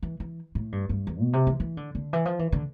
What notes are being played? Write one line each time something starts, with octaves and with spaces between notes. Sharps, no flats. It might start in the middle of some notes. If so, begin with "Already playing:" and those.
E3
E3
A2
G2
G2
E2
B2
C3
E3
E3
D3
D3
E3
F3
E3
D3